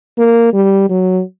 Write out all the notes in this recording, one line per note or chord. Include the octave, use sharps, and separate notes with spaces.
A#3
G3
F#3